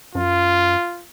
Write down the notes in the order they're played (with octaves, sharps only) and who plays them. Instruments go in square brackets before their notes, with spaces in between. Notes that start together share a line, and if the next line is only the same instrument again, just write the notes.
[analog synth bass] F#2 [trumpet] F4